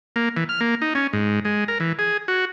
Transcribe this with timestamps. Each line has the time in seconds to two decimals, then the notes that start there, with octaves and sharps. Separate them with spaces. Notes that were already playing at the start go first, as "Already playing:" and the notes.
0.16 A#3
0.37 E3
0.49 F6
0.61 A#3
0.82 D#4
0.95 C#4
1.13 G#2
1.45 G#3
1.68 A#4
1.80 E3
1.99 G#4
2.28 F#4